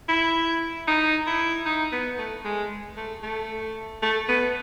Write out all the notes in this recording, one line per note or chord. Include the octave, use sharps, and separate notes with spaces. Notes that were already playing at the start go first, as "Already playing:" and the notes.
E4
D#4
E4
D#4
B3
A3
G#3
A3
A3
A3
B3